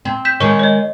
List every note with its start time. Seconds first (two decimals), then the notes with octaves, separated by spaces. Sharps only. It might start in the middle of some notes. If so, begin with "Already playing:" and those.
0.05 C4
0.25 G6 B6 E7
0.40 D#3 G#3 C#5 C#6
0.59 C#5 D#5